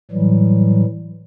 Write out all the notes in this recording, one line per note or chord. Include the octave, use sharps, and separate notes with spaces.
A2 E3 F#3 G3